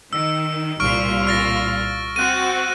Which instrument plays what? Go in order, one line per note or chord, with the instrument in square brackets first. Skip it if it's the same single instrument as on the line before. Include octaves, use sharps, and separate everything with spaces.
[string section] D#3 [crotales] E6
[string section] C2 A#2 F4 [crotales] C#6 F6 D7
[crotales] F6 A6 A#6
[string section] C4 F#4 [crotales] F#6 D#7